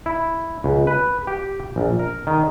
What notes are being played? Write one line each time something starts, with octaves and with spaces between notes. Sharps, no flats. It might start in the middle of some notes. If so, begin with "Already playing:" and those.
E4
C#2
B4
G4
A#1
A#4
D#3